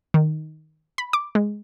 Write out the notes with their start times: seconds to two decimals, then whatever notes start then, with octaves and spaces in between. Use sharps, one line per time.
0.14 D#3
0.98 B5
1.13 D6
1.35 G#3